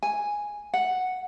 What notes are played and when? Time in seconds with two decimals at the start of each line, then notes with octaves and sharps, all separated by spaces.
0.03 G#5
0.74 F#5